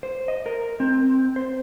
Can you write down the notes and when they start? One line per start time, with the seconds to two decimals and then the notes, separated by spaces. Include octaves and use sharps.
0.03 C5
0.28 D#5
0.46 A#4
0.80 C4
1.36 C5